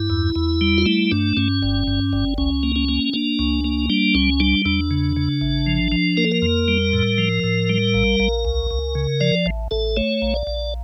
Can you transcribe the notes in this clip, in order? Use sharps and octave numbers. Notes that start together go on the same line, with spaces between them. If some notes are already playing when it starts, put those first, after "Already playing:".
Already playing: G2 E4
E2
E2
G3
F4
A3 E4
G2 D4
G2 C#4
G1
G2
G1
C#2 C#4
A#3
C#4
A#3
A#3 D4
C#2
A#3
G3 D4
C#2 C#4
G3 D4
E2 D4
C#3
C#3
A1
F3
F3
A#3 A#4
A4
A#4
F2
G3
A2
F3
A2
G3
A#1
A#1
C#2
C#2
C#3
F3 D5
A1
A1 A4
A3 C#5
A#1
D5
A#1